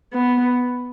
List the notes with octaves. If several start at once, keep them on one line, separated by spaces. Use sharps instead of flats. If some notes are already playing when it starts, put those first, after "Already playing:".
B3